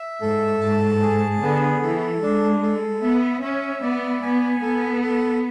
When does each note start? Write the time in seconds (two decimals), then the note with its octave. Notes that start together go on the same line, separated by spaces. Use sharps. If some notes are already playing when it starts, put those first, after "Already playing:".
Already playing: E5
0.21 G#2 A4
0.61 G#2 A5
1.02 G#4
1.41 D3 B3
1.82 E3 A4
2.22 G#3 D4
2.62 A4
3.02 B3 E5
3.41 C#4 E5
3.82 B3 D5
4.22 B3 G#5
4.62 B3 A4
5.02 A4